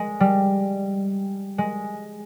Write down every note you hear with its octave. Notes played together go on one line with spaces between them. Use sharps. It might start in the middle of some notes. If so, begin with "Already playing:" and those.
Already playing: G#3
G3
G#3